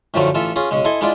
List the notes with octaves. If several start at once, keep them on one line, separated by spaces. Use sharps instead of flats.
F#2 A2 D3 F3 F#3 A3
A1 E3 F4 A4 E5
C#4 F4 G#4
B1 C#3 G#3
E4 A4 D#5 G#5 C6
G#3 D4 E4 F4 D5